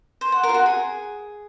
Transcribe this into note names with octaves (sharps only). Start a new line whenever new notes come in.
C5
F#5
A#4
F4
F#4
G#4